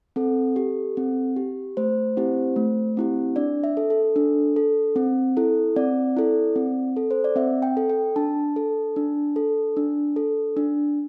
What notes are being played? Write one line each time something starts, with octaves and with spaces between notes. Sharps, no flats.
C4 A4
G4
C4
G4
A3 C5
C4 E4 G4
A3
C4 E4 G4
D4 D5
E5
A4
A4
D4
A4
C4
E4 A4
C4 D5
E4 A4
C4
A4
C5
D5
C4 E5
G5
A4
G5
D4 A5
A4
D4
A4
D4
A4
D4